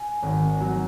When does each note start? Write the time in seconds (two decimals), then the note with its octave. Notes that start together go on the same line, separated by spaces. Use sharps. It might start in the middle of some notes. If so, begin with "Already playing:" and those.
Already playing: G#5
0.23 G#1
0.60 F#3